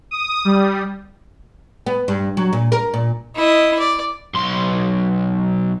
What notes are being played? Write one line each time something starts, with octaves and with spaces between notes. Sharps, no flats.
D#6
G3
B3
G2
F#3
A#2
A#4
A#2
E4 D#5
D5
B1 C6